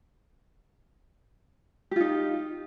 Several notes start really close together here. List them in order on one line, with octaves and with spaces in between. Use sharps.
G4 F4 D#4